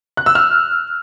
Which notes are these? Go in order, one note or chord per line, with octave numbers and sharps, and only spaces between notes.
F#6
E6
F6